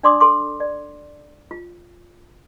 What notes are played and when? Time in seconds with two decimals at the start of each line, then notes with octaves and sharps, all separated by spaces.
0.03 D4 D5 C6 D6 D#6
0.20 A4 C6 D6
0.60 D5
1.51 F4